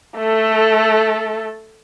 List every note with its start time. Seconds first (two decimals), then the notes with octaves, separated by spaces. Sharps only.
0.18 A3 A4